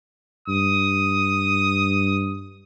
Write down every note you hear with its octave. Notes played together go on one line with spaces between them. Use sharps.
G2 D#6